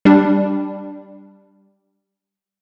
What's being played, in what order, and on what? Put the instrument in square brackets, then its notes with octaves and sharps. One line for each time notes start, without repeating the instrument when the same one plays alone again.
[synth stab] G3 D4